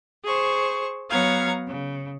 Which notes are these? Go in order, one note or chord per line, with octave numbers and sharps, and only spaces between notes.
G#4 C5 C#6
F#3 B3 C#5 F5 A#5 G#6
C#3